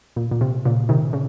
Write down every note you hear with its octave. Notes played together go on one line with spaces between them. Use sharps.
A#2
A#2
C3
A#2 C#3
C3 D#3
C#3